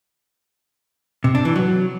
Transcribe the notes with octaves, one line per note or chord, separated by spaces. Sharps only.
C3
D4
E3
F#3